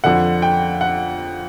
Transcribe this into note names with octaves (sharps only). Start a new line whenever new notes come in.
F2 D3 F#5
G5
F#5